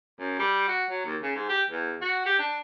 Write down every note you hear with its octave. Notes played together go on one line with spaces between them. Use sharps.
F#2
G3
F#4
F#3
D#2
C#3
G#2
G4
E2
F#4
G4
D4